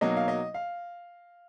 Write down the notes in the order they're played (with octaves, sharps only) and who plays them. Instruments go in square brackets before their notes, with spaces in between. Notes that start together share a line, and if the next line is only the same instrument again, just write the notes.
[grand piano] B2 F#3 A#3 D#4 D#5
F5
D#5
F5